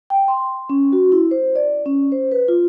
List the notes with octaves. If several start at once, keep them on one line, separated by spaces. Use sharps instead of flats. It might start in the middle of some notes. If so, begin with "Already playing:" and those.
G5
C6
C#4
F#4
E4
C5
D5
C#4
C5
B4
F4